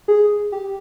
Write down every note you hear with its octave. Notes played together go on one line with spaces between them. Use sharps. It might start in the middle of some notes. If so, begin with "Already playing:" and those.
G#4
G4